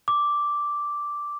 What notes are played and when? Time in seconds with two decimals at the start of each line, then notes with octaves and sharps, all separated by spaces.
0.08 D6